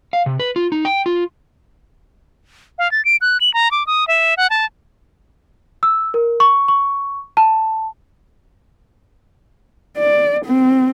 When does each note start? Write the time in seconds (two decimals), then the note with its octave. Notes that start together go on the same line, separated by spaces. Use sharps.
0.13 F5
0.26 C3
0.40 B4
0.56 F4
0.72 D#4
0.85 G5
1.06 F4
2.78 F5
2.92 A6
3.05 D7
3.21 F#6
3.41 F#7
3.54 A#5
3.71 D6
3.87 D#6
4.08 E5
4.37 F#5
4.50 A5
5.83 E6
6.14 A#4
6.40 C#6
6.68 C#6
7.37 A5
9.97 D5
10.45 C4